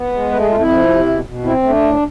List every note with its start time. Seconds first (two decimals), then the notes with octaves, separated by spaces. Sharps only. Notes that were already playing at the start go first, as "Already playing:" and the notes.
Already playing: B3
0.12 G#3
0.31 A3 B4
0.40 G#4
0.49 F2 F4
0.59 E4
0.69 F3
0.88 C3
1.06 B2
1.25 B2
1.44 C4 E4
1.63 A3
1.69 D4
1.82 A2